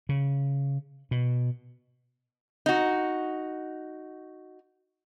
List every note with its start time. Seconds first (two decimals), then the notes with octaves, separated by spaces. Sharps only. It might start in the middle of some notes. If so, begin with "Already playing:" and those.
0.09 C#3
1.11 B2
2.66 D#4 F#4